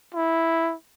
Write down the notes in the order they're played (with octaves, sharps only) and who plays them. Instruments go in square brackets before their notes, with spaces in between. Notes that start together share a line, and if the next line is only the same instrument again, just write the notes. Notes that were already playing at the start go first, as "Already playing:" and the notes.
[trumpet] E4